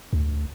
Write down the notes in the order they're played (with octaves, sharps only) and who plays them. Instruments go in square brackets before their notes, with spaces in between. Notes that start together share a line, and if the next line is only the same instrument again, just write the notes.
[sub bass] D2